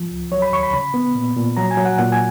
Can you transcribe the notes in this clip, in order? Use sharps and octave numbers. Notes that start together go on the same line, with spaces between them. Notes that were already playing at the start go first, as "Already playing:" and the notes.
Already playing: F3
C#2
F#3 C#5
B5
D#2 C#6
B5
C#3 B5
B3
A#2
A#2
F#3 A#5
G#5
F#3
F#5
A#2 F#5
G#5